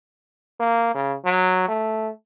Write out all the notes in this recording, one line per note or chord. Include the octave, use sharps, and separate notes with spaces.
A#3
C#3
F#3
A3